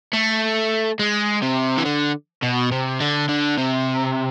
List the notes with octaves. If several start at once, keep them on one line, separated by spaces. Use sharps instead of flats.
A3
G#3
C3
E3
D3
B2
C3
D3
D3
C3